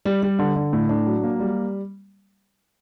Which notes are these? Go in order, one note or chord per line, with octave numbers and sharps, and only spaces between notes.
G3
G3
D3
D3
A2
D4
F#3
A#3
G3